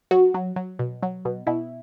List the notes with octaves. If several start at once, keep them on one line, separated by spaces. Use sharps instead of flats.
F#3 F#4
F#3
F#3
B2
F#3
B2
B2 E4